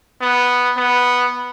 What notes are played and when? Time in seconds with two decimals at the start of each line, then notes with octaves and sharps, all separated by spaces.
0.21 B3
0.77 B3